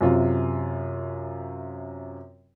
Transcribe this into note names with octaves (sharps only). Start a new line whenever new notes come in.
F#2 C3 F4